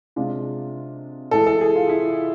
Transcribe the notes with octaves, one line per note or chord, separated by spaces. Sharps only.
C3 G#3 D4 F4
A2 E3 G#3 A4
A4
G#4
F4
E4